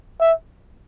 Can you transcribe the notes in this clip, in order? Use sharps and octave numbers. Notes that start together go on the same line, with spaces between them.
E5